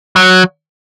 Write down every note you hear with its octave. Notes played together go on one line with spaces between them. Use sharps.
F#3